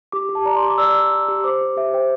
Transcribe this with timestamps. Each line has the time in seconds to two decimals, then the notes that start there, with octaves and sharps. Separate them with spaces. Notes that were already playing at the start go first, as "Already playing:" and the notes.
0.12 G4 D6
0.29 G4
0.35 A5
0.45 D5 A#5
0.56 C6
0.63 G4 D6
0.78 D5 E6
0.94 D5
1.11 D5
1.29 G4
1.44 C5 D6
1.61 G4
1.77 G4 E5
1.93 C5 G5